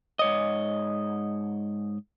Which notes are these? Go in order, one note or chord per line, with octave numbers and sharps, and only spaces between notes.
G#2 C#5 D#5